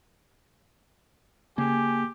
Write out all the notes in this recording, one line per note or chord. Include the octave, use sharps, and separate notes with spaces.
C#3 A#3 G4 G#4 G#5